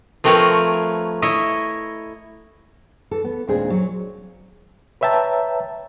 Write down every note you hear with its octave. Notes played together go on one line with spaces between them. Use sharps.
F3 A3 C4 A#4 B4 C#5
E4 C#5 D#5 E5
E3 A4
B3
D#2 A#2 G#3 C4 D4 G#4
F#3 C#5
B4 C#5 E5 G5 A5 A#5